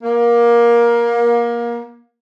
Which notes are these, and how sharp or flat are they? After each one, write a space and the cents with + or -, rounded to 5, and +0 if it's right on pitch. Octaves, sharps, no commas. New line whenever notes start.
A#3 +20